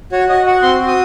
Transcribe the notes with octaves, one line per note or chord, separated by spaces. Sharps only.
F#4 C#5
F#4 D#5
F#4 F#5
C4 C6
F#4
D#6